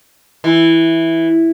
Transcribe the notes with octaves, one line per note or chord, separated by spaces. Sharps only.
E3